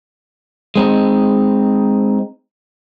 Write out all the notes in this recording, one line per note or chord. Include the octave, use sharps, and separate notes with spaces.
G#3 C4 D#4